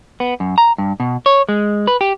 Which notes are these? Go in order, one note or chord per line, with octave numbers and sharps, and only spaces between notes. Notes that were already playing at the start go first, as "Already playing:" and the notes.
B3
F#2
A#5
G2
B2
C#5
G#3
B4
G4